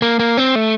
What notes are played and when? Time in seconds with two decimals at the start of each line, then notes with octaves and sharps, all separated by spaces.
0.02 A#3
0.19 A#3
0.37 C4
0.55 A3